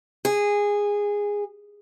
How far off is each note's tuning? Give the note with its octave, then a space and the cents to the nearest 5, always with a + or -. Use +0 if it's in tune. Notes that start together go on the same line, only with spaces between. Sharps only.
G#4 -15